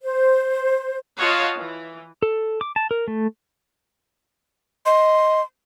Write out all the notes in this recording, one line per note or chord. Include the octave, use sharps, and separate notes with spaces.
C5
F4 C#5 D#5 F5 F#5 A5
E3
A4
D6
A5
A#4
A3
D#5 C6